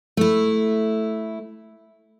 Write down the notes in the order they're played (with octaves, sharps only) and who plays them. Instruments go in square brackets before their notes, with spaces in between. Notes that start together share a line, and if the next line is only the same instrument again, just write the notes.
[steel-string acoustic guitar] A3 E4